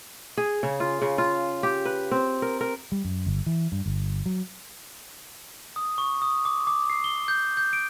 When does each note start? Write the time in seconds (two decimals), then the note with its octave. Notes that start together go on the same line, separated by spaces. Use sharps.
0.37 G#4
0.63 C#3
0.80 F4
1.02 C#3
1.18 F4
1.63 G4
1.85 B4
2.11 C4
2.42 A#4
2.61 A#4
2.92 G3
3.05 F#2
3.27 G1
3.46 E3
3.72 G2
3.86 G1
4.26 F#3
5.76 D#6
5.98 C#6
6.22 D#6
6.45 D6
6.67 D6
6.90 C7
7.04 G7
7.28 G6
7.57 G6
7.73 D7